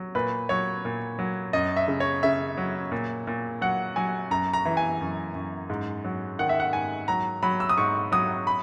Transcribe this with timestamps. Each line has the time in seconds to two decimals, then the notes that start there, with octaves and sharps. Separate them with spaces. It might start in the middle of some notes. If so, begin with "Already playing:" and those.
Already playing: F#3
0.15 A#2 B4
0.49 F#3 C#5
0.85 A#2
1.19 F#3
1.53 F#2 D#5
1.76 E5
1.88 C#3
2.00 C#5
2.23 C#3 E5
2.57 F#3
2.92 A#2
3.27 A#2
3.61 F#3 F#5
3.96 F#3 G#5
4.31 F#2 A#5
4.53 A#5
4.65 E3
4.77 G#5
5.01 F#2
5.35 F#2
5.70 G#2
6.05 F#3
6.39 D#3 F#5
6.49 E5
6.60 F#5
6.73 G#2 G#5
7.08 F#3 A#5
7.43 F#3 B5
7.60 E6
7.69 D#6
7.77 G#2 C#6
8.12 F#3 D#6
8.47 B5